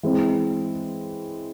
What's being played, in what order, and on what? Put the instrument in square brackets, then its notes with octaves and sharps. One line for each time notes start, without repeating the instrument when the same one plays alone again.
[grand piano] E3 G#3 C4